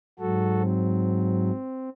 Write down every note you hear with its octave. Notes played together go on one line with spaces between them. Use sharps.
G#2 F#3 F#4 A4
C4